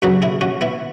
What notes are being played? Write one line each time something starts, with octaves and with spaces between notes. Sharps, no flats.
F#2 C#3 F#3 F#4 B4
E4 G#4
C#4 F#4
B3 E4